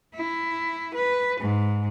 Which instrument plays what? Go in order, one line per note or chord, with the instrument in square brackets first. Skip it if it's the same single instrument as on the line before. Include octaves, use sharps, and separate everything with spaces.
[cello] E4
B4
G#2